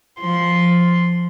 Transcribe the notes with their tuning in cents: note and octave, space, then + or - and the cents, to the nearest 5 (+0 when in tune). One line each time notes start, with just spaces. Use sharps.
F3 +0 C6 +0